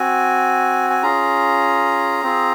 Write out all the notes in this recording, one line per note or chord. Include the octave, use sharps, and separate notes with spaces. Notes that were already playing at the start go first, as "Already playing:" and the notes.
Already playing: C4 F#4 G#5
G#5
C#4 F4 G#4 A#5
C4 F4 G#4